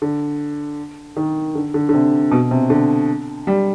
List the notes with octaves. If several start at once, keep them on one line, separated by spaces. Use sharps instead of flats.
D3
D#3
D3
D3
D3
C3
B2
C3
D3
G3